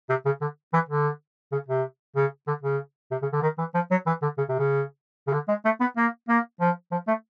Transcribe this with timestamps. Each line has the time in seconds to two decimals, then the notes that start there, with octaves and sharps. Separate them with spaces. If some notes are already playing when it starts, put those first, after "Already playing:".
0.10 C3
0.25 C#3
0.41 D3
0.73 E3
0.89 D3
1.52 C#3
1.68 C3
2.16 C#3
2.47 D3
2.63 C#3
3.11 C3
3.22 C#3
3.33 D3
3.42 D#3
3.58 E3
3.75 F3
3.91 F#3
4.07 E3
4.22 D3
4.38 C#3
4.49 C3
4.59 C#3
5.27 C#3
5.33 D3
5.48 G#3
5.65 A3
5.80 B3
5.97 A#3
6.29 A#3
6.60 F3
6.91 F3
7.08 A3